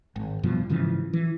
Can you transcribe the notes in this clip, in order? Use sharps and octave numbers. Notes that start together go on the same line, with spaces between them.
G#1
F#1 G2 B2 F3
G#2 C#3 E3 F3
E3